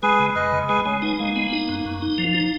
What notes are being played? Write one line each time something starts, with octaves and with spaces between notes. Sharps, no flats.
G#3 G#4 B4
C#3
F2 B4 D#5
C#3
G#3 G#4 B4
G#3 C#4
B3 D#4
G#3 A#3
B3
D#4
F#2
F#2
D#4
F3
D#4